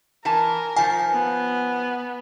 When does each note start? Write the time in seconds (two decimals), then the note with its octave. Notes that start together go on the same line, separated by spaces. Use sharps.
0.25 E3 A#4 G#5 A5
0.77 D#3 F3 F5 G#5
1.11 B3